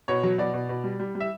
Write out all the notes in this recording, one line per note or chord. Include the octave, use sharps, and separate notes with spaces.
B2 C#5
F#3
B2 D5
B2
B2
G3
G3
G3
E5